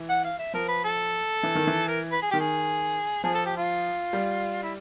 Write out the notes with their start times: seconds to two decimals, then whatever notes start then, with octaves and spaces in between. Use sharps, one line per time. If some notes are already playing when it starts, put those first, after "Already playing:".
Already playing: E3
0.09 F#5
0.24 F5
0.39 E5
0.54 F3 A#4
0.68 B4
0.84 A4
1.43 E3
1.55 D#3
1.67 E3
1.88 A#4
2.12 B4
2.22 G#4
2.31 D#3 G4
2.40 G#4
3.23 F3 G#4
3.34 A4
3.46 G4
3.57 F4
4.13 G3
4.63 E4